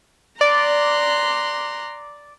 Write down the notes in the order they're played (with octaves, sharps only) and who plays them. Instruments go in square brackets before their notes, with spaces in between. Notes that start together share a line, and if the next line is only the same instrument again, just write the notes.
[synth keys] D5 [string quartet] A#5 C6 F#6